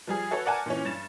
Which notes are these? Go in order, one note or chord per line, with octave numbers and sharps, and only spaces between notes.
F3 G3 G#4
F#4 A4 B4 C#5
A#4 D5 F#5 G#5 A5
A#2 E3 C#4
G2 A6 E7